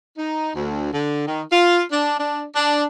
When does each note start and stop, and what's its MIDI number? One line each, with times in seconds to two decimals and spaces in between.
0.17 0.52 63
0.54 0.92 38
0.92 1.24 50
1.27 1.43 51
1.52 1.82 65
1.92 2.16 62
2.19 2.43 62
2.55 2.85 62